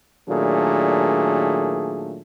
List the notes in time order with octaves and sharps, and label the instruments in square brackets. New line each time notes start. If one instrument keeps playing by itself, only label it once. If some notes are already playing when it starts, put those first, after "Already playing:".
[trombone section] A#2 D#3 F#3 A3 D4 G#4